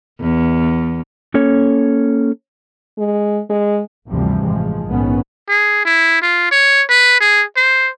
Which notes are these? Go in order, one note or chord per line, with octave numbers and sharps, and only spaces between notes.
E2
A#3 C#4 A4 C#5
G#3
G#3
G1 D2 C3 E3 F3 G3
A1 G2 F3 G#3
A#1 G#2 D#3 B3 C#4
G#4
E4
F4
C#5
B4
G#4
C5